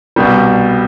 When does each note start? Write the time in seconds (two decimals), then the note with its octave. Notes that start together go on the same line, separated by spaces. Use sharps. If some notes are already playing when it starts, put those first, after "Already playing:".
0.16 C2 B2 G3